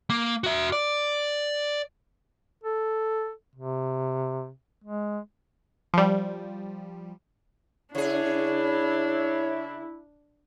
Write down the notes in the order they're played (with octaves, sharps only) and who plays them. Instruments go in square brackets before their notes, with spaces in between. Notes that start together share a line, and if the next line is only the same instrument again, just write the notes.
[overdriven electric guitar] A#3
F#4 E5
D5
[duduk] A4
C3
G#3
[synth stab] F3 G3
[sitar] C#3 G#4 [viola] D4 [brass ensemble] E4 [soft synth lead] C#5